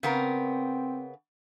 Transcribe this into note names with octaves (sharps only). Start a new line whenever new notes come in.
C#3 B3 C4 A#4